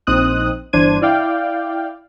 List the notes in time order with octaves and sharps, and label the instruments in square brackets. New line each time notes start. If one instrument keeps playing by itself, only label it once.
[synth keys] A#1 C4 D#4 D#6 F#6
G1 E3 D4 C5 G#6 D#7
E4 D5 F5 G5